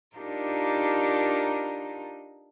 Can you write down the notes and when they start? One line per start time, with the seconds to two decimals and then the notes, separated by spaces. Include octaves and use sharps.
0.18 D4 D#4 F4 G4 A4 A#4